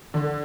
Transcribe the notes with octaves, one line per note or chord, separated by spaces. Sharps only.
D3